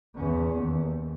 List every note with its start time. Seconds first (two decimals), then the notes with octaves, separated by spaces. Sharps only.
0.14 E2 C#4
0.56 D#2